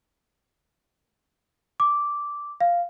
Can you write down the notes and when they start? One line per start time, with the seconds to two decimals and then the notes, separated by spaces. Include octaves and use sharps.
1.80 D6
2.61 F5